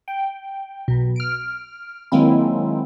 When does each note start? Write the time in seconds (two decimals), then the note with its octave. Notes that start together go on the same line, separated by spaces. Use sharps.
0.08 G5
0.88 B1 B2
1.16 F6 D7
2.12 D#3 F#3 G#3 A#3 C4 E4